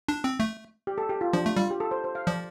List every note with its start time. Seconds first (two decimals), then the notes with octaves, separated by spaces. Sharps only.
0.08 D4
0.24 C4
0.40 A3
0.87 G4
0.98 A4
1.09 G4
1.21 F4
1.33 F3 D4
1.45 A3
1.56 G3 F4
1.70 G4
1.80 A4
1.91 C5
2.04 C5
2.15 F5
2.27 F3 D5